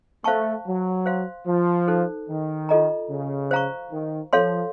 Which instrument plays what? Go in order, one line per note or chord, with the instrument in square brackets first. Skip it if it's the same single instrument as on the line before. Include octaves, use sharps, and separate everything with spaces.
[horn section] A3 [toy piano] C5 F5 A5 C#6
[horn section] F#3
[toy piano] C5 F5 C6
[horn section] F3
[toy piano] D#4 A4 C5
[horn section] D#3
[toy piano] F4 A4 D#5 A#5
[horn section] C#3
[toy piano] C5 F5 A#5 C#6
[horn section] D#3
[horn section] F3 [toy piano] A4 C#5 F5 C6